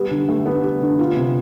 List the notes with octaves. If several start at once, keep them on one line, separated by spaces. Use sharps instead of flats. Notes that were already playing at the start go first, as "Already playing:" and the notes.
Already playing: G3 B3 G4
D3
A3
B3 D4
G4
D3
F4
C3